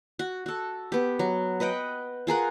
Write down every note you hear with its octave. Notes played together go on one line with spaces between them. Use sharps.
F#4
F#4 A4
B3 G4
F#3
B4 D#5 F#5 G5
F4 G#4 A#4 F#5